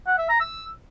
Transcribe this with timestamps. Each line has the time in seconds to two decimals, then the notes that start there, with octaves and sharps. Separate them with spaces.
0.07 F#5
0.18 E5
0.29 A#5
0.40 E6